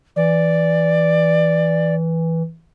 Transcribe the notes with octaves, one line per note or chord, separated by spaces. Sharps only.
E3 D5